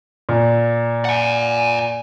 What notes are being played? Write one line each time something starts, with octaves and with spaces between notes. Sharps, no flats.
A#2
F#5 G#5